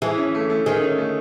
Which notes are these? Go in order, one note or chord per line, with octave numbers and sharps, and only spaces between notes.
E3 G#4
C#4
A3
A3
D#3 G#4
C#4
A3